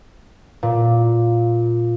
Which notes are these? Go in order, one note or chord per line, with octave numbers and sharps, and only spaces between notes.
A#2